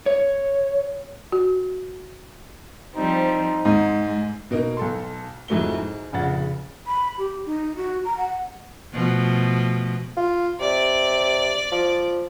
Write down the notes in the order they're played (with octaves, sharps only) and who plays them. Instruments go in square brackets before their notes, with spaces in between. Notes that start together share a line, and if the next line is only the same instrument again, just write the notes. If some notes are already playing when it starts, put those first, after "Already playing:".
[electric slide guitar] C#5
[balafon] F#4
[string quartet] F3 G3 C4 [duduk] D#4
[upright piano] G#2 [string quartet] G#3
[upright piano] B2 A#3 D#4
B1 A4 C6
F2 G#2 F#3 A3 E4 G7
G#2
F1 A#1 C#3 F#5 A6
[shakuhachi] B5
G4
D#4
F#4
A#5
F#5
[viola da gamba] B2 F3 A3
[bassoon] F4
[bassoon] C3 [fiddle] D5
[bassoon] F3